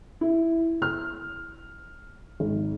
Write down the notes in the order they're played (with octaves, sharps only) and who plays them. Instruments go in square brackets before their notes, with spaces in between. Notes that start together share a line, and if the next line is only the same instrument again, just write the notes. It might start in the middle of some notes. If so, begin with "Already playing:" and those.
[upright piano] E4
F6
G#1